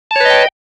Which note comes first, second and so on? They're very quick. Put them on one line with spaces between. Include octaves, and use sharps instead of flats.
A5 C#5 B4 D#5 G5